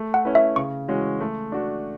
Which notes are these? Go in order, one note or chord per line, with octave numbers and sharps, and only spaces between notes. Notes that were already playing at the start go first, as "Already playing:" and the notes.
Already playing: A3
F#5
C#4 E4 B4
E5
C#3 C#6
E3 G#3 C#4 F#4
A3
D4 F#4